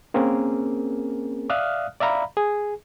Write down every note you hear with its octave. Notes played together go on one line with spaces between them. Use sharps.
A#3 C4 C#4 G#4 A#4
D5 E5 F5 D#6 F6 F#6
D5 E5 F5 A#5 B5
G#4